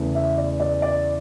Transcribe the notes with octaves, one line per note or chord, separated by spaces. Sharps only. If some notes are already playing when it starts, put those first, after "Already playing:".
Already playing: E2 C#3 E3 A3
E5
D5
D5
D5